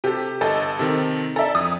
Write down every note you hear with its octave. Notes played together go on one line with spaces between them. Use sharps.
C3 G4 A4
G1 A4 D#5
C3 D#3 C4
A4 D5 E5 A#5
F2 D#6